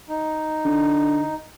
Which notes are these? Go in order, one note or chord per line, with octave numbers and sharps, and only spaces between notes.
D#4
D3